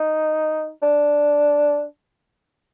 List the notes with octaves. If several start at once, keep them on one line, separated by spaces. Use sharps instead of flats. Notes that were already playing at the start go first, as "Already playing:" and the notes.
Already playing: D#4
D4